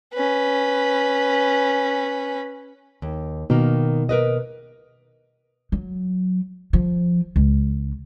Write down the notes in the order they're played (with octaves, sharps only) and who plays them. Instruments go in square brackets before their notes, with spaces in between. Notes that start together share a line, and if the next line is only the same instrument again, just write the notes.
[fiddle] C#4 B4
[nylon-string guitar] D#2
[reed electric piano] B2 [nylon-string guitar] D#3 A#3
[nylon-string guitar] A#4 B4 D#5
[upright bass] F#3
F3
C#2